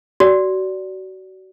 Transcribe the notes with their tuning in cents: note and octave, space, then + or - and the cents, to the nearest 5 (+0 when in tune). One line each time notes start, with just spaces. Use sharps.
F#4 +30 D5 -15